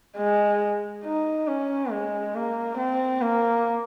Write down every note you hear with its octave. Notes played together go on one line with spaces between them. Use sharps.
G#3
D#4
C#4
G#3
A#3
C4
A#3